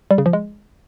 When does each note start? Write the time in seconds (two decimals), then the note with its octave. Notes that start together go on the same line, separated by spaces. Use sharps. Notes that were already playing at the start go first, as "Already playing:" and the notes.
0.11 G3
0.18 C#3
0.26 F3
0.33 G#3